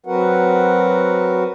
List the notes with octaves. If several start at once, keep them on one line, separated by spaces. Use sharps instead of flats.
F#3 C4 F#4 A#4 B4 F#5